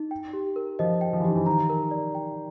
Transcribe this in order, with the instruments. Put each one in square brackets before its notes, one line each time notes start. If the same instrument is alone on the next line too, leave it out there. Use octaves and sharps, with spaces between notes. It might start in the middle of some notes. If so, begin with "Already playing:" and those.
Already playing: [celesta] D#4
G5
G4
A#4
[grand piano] F3 [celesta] D#5
[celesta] G5
[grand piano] F3
E3
[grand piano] D#3 [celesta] G4
[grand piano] E3
[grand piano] D#3 [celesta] A#5
[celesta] A#4
D5
G5